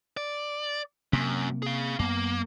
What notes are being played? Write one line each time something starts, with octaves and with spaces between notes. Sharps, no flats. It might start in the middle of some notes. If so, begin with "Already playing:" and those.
D5
F#2 C3 A#3
G#4 F5
F#2 A#3 B3